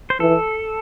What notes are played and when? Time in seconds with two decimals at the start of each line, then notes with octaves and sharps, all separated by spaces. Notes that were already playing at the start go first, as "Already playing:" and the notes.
0.10 C5
0.20 E3 A4